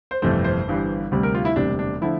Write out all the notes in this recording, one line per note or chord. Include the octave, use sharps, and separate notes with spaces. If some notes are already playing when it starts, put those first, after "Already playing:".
C5
G1 F2 C3 E3 A3 C5
C5
G1 G2 E3 G3
D2 C3 G3
A#4
F4
E4
E1 D2 C3 G3 D4
D4
D3 F3 A3 E4